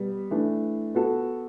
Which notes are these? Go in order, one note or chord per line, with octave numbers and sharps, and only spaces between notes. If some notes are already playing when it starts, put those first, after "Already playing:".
Already playing: B2 G3 B3
E3 A3 D4
B3 F#4 A4